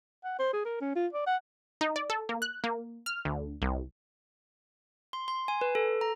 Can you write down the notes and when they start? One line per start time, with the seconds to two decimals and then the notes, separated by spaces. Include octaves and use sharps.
0.24 F#5
0.39 C5
0.53 G#4
0.65 A#4
0.81 C#4
0.96 F4
1.13 D5
1.27 F#5
1.81 D#4
1.96 D5
2.10 A4
2.29 A#3
2.42 F#6
2.64 A#3
3.06 F6
3.25 D2
3.62 C2
5.13 C6
5.28 C6
5.48 G#5
5.61 B4
5.75 A4
6.01 A#5